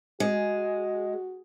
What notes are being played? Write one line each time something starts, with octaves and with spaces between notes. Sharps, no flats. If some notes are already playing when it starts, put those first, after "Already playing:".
G#3 F#4